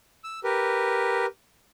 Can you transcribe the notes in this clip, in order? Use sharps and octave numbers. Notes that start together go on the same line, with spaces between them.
E6
G4 A#4 B4